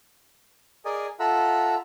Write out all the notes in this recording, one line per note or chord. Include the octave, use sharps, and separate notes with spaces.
G#4 A#4 D5 D#5 G#5
F4 A4 E5 F#5 A#5 E6